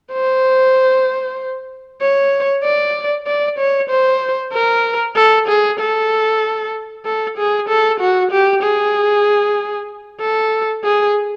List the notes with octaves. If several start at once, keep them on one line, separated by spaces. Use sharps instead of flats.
C5
C#5
D5
D5
C#5
C5
A#4
A4
G#4
A4
A4
G#4
A4
F#4
G4
G#4
A4
G#4